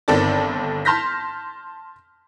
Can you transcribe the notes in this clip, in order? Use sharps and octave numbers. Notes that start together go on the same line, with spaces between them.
G1 D#3 C4 A4 D5 A6
A5 C6 F6 G6 A#6 B6